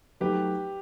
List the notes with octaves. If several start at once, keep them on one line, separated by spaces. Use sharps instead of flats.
F#3 A3 D#4 G4 A4 B4